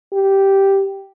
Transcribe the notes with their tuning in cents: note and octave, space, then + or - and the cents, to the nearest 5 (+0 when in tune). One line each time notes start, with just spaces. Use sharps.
G4 -5